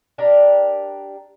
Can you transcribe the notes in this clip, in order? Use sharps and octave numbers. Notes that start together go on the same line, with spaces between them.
D4 G4 A#4